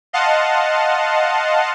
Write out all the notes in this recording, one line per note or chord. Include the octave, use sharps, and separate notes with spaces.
D#5 F5 F#5 A5 C6